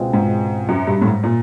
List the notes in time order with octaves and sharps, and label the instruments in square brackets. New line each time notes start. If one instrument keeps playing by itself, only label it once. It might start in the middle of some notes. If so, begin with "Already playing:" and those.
Already playing: [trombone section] C#2 B2 G#3 C4 F4
[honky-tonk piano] G#2
F#2
G2
A2
G#2
A#2